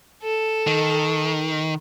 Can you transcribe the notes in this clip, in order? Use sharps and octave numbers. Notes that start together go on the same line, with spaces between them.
A4
D#3